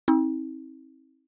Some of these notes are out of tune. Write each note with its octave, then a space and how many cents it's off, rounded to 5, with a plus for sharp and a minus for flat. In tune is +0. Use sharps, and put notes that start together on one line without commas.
C4 +30 D#4 +45